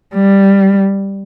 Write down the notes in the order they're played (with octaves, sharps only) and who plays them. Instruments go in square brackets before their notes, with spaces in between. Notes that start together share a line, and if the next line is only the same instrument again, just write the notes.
[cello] G3